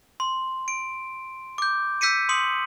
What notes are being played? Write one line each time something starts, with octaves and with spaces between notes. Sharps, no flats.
C6
D7
D6 G6
E6 G6 B6 C#7 D#7
C6 D#6 C#7 F#7